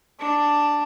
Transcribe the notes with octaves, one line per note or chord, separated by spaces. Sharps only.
D4 A5